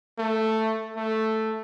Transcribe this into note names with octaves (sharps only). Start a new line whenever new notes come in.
A3
A3